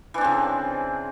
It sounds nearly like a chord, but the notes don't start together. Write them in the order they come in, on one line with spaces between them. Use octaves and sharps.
E3 D4 C4 C#3